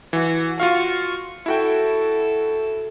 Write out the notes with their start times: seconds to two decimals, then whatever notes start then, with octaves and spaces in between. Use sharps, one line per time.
0.13 E3 F#4
0.60 F4 F#4 F5 C#6
1.46 E4 F#4 A4 G5